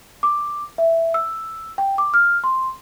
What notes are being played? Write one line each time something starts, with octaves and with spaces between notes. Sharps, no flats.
D6
E5
E6
G5
D6
F6
C6